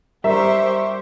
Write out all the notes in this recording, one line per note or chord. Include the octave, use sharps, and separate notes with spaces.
G3 G4 A#4 C5 E5 C#6